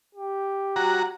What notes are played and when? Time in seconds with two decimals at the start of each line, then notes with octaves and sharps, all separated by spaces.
0.15 G4
0.76 F#4 A#5